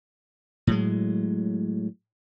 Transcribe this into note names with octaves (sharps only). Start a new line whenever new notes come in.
A2 F#3 G#3